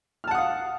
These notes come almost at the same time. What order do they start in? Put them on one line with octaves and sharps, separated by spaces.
F6 A5 F#5 D#6 F5